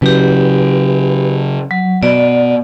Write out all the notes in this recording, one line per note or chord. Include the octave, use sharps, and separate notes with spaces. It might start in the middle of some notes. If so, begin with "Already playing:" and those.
C#3 F#3 G4 B4
F#3
B2 D5